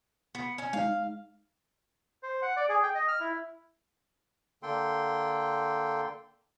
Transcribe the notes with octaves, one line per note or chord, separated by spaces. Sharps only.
B3
C#4
G#3 D#4 F5
C5
F#5
D5
G#4
G5
D#5
F6
E4
D3 A#3 A4 G5 C6